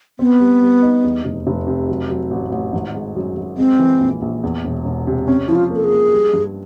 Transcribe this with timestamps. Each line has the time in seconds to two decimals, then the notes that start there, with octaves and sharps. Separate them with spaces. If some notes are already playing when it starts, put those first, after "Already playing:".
0.19 B3 C4
0.40 G3
0.62 G3
0.82 D#4
1.04 E2
1.25 F1
1.47 F1
1.67 C3
1.89 F#3
2.09 F#3
2.31 A1
2.52 A1
2.73 G#1
2.95 G#3
3.16 F#2
3.37 F#2
3.58 G#3 C4
3.79 E3
4.00 A#1
4.22 A#1
4.43 E2
4.65 E1
4.85 E1
5.07 C3
5.27 C4 C#4
5.48 F3 E4
5.55 F4
5.70 A#3
5.75 A4
5.84 G#4
5.91 A#3
6.12 G3
6.33 G2